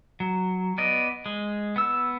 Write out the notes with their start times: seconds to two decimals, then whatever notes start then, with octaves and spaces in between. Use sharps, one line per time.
0.20 F#3
0.78 B3 D5 D#5
1.26 G#3
1.76 B3 E6